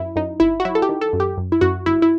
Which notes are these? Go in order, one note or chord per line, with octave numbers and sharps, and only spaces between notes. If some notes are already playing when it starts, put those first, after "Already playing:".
Already playing: F#2 E4
F#2 D#4
G1 E4
F#4
F#3 E4
A4
G4
D#3
A4
F#2
G4
F#2
E4
F#2 F#4
G1 E4
E4